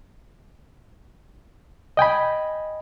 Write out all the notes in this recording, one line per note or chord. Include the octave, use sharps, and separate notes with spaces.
D#5 G5 G#5 B5